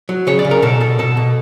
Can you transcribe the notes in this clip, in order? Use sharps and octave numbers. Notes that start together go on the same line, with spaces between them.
F#3
C#3 C#5
D5
C#3
A#4
B2 A4
B2 A4
B2 A4
B2